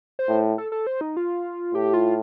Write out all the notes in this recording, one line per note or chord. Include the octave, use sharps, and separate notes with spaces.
C5
A2
A4
A4
C5
D#4
F4
A2 G4
F4